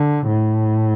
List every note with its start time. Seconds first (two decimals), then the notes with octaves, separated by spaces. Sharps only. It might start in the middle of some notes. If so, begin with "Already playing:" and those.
Already playing: D3
0.27 A2